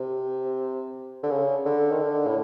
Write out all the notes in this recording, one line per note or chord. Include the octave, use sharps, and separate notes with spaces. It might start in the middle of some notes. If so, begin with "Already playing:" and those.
Already playing: C3
D3
C#3
D3
D#3
D3
A2